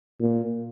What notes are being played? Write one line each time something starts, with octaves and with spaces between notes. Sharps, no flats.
A#2